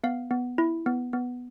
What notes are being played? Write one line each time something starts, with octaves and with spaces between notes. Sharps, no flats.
B3 F5
B3
E4
B3
B3